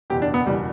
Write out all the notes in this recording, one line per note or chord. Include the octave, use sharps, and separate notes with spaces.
F#1 E2 B2 G4
D4
B3
F#1 E2 B2 G3